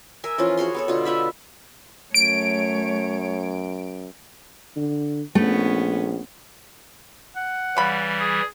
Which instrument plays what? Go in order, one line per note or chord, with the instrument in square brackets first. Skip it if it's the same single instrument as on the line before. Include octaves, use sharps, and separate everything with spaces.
[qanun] A#4 E5 G#5
E3 F3 C#4 F4
F#4 G#4 C#5 C6
B3 A4 C#5
B2 D3 F4
B3 F4 E5 B5
[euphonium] F#2 [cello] A3 C#5 [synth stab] D7
[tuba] D3
[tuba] A#1 [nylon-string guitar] A3 [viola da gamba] B3 C#4
[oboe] F#5
[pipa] C#3 B5 [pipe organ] E3 G3
[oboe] G#4